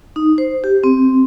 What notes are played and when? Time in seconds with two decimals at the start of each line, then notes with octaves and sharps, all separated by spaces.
0.16 D#4
0.38 C5
0.64 G4
0.84 C4